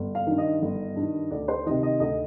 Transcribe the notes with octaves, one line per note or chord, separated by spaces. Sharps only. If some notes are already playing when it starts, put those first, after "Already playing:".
Already playing: G1
F5
G2 D#3
D#5
G1
G2
D#3
D2 D5
C5
C3 D#3 D#5
D#5
D2 D#5